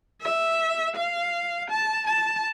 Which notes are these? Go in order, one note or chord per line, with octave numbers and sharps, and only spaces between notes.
E5
F5
A5
A5